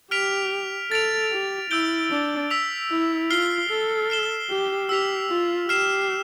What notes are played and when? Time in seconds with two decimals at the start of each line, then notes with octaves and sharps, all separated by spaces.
0.11 G4 F6 B6 D7 F7
0.91 A4 A6 D7 F7
1.31 G4
1.71 E4 E6 G6 D7 G7
2.10 D4
2.50 E6 B6 F7
2.90 E4
3.30 F4 F6 C7 G7
3.70 A4
4.10 F6 C7 E7 G7
4.50 G4
4.89 G4 E6 B6 F7
5.29 F4
5.69 G4 F6 C7 E7